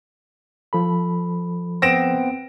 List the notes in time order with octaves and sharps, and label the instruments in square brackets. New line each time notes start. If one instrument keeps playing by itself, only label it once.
[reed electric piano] F3 A4 B5
[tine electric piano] B3 C4 [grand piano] A#6 D7 E7